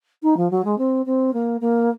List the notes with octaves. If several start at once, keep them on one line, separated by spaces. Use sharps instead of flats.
D#4
F3
F#3
G#3
C4
C4
A#3
A#3